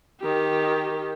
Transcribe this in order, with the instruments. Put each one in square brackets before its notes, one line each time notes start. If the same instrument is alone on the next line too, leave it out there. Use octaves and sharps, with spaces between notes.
[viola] D#3 G4